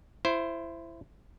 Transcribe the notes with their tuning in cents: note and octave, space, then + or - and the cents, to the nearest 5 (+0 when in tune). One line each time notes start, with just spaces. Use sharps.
E4 +20 C5 +0